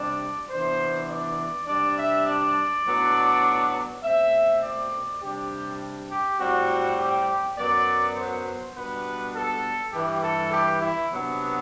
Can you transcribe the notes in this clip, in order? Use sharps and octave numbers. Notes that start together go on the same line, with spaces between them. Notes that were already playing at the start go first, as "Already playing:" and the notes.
Already playing: C3 G3 D4 D5
C3 E3 B3 D4 C5
D5
C3 G3 D4 D5
E5
D5
A2 F#3 B3 D4
B2 A3 C4 E5
D5
C3 G3 D4 G4
G4
A2 G3 C4 F#4
G4
F#2 F#3 B3 D5
C5
B2 G3 B3 D4 B4
A4
G2 E3 G3 G4
A4
G4
E4
C3 F#3 B3 D4